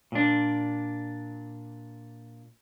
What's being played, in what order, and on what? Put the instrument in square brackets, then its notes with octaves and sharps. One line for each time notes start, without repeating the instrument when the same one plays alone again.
[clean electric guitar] A#2 D4